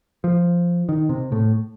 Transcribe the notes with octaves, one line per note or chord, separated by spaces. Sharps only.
F3
D#3
C3
A2